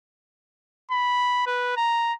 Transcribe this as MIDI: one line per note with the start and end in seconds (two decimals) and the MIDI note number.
0.92 1.46 83
1.47 1.76 71
1.77 2.13 82